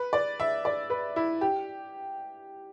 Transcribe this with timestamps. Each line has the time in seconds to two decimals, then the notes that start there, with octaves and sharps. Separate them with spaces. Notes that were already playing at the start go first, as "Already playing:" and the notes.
Already playing: B4
0.13 D5
0.40 E5
0.65 D5
0.90 B4
1.16 E4
1.41 G4